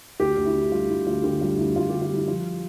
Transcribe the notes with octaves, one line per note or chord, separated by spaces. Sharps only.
D2 G4
D2
E4
D3
G3 F4
D2 E4
D2 F4
D3 G4
G3 F4
D2 E4
D2 F4
D3 G4
F4
G3 E4
F3 F4